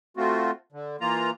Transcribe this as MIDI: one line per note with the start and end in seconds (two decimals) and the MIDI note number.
0.17 0.51 57
0.17 0.51 60
0.17 0.51 65
0.17 0.51 66
0.72 0.96 50
1.01 1.31 52
1.01 1.31 58
1.01 1.31 65
1.01 1.31 82